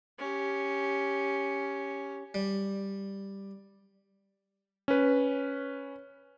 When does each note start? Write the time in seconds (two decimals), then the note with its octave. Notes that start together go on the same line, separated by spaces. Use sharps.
0.19 C#4 G4
2.34 G3
4.88 C#4 B4